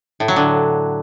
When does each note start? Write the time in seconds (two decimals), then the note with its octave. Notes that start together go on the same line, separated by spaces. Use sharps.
0.20 A2
0.28 F#3
0.36 D3